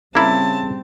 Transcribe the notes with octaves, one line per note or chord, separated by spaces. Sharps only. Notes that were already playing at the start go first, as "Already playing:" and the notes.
C#3 G3 A#3 C4 E4 A5